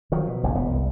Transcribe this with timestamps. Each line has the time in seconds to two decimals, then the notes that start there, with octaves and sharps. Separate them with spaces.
0.12 D#3 F3 F#3
0.27 B2
0.43 F1 A#1 E2
0.54 E1 B3
0.71 C2